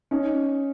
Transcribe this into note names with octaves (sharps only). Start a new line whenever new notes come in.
C#4 D#4